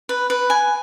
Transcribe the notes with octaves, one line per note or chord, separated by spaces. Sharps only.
B4
B4
G#5